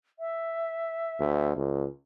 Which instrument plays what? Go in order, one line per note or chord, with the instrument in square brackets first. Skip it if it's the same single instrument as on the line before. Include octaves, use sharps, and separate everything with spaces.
[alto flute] E5
[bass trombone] D2
C#2